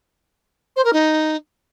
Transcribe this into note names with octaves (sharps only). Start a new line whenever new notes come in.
C5
A#4
D#4